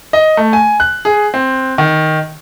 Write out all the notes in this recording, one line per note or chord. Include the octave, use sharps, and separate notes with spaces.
D#5
A3
G#5
F#6
G#4
C4
D#3